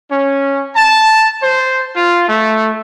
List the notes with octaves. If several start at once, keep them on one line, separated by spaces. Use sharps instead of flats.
C#4
A5
C5
F4
A3